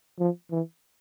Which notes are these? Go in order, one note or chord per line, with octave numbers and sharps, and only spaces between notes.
F3
E3